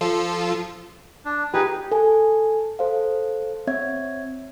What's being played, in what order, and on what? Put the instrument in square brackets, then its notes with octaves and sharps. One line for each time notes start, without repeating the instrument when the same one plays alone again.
[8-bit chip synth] F3 F4 A4
[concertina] D4
[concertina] D#4 G#4 B4 [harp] G4
[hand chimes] A4 G#5
A4 C5 F5
C4 C#5 E5 G#6